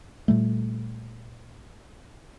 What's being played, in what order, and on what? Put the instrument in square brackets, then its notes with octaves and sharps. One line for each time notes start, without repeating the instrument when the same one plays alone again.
[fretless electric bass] A#2 G3 A3